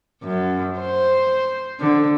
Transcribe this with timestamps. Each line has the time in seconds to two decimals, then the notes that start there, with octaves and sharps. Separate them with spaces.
0.23 F#2
0.79 C5
1.80 D3